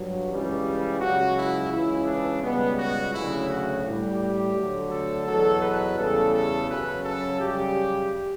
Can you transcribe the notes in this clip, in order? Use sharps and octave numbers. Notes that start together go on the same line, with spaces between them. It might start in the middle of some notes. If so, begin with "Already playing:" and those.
Already playing: G2 F#3
C#2 C#3 E3 G3
C#2 C#3 F#3 F#4
E4
C#2 C#3 E3 E4
D4
C#2 B2 G3 B3
F#4
D2 C#3 F#3 E4
F#4
A2 G3 G4
D2 D3 F#3
A4
E2 B2 F#3 A4
B4
E2 C#3 G3 A4
A4
F#2 C#3 F#3 B4
A4
F#2 C#3 G3 G4